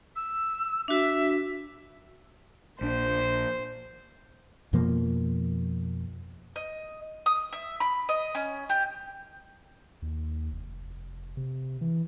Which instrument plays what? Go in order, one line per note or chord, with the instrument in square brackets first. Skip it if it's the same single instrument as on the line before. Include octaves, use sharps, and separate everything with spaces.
[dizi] E6
[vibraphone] D4 F#4 [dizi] E5
[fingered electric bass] A#1 D4 [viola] C5
[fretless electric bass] F2 B2 F3 A#3
[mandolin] D#5
D#6
E5
B5
D#5
C#4
G4
[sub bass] D#2
F1
C3
E3